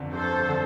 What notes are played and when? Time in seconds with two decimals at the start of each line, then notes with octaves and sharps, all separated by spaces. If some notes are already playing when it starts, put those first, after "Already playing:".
Already playing: G1 F2 D3
0.13 G1 A4 C5
0.49 D3